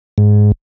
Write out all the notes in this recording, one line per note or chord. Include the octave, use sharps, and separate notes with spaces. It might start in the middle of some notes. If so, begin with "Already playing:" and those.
G#2